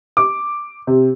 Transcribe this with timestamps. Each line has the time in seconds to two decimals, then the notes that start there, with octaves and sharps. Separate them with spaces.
0.17 D6
0.87 C3